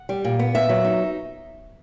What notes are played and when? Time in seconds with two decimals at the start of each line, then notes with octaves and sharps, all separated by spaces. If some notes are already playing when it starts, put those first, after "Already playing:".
Already playing: F#5
0.09 G3
0.24 A#2
0.39 B3
0.55 A#2 E5
0.69 F#3
0.85 D#4